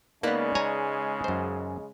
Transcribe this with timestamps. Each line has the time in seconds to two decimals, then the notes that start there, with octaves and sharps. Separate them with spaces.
0.23 C#3 G#3 A#3 B3 D#4 B4 D5
0.55 C#5 G#5 A#5
1.24 F#2 C5